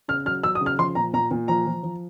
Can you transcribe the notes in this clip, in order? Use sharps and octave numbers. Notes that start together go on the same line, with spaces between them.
C#3 F6
F#3 F6
F#3 E6
D#6
C#3
F6
F3 C6
A#2 A#5
A#2 A#5
A#2
F3 A#5
F3
F3